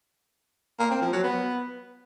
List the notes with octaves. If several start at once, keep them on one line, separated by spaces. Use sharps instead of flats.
A#3
C4
F3
F#3
B3